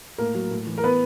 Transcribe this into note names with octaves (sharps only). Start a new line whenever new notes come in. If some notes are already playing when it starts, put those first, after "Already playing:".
A2 A#3 A#4
F#3
A2
E3
A#4
B3 B4